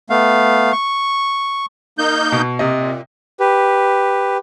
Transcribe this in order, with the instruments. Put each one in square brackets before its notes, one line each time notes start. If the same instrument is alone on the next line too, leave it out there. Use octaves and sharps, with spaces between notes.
[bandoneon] A3 B3 F5
C#6
[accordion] A#3 D#4 G6
[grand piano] B2
[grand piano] C3 D#5 [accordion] A#3
[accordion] A#2
[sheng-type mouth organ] G4 B4